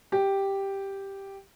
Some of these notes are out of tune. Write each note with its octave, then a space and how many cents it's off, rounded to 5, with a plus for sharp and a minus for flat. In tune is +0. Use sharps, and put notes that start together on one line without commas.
G4 +0